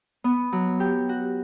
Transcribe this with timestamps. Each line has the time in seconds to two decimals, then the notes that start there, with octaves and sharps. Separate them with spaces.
0.24 B3
0.52 F#3
0.80 G4
1.09 F#4